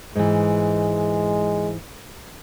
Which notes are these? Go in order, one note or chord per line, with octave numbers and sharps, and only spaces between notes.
G#2 E3 G#3